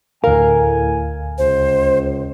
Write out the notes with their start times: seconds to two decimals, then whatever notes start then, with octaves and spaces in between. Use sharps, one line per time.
0.24 D2 A2 A#4 F5 G#5
1.38 C#2 C5